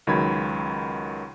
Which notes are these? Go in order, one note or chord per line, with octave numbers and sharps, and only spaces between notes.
C#2 D#3 F#3 B5 G#6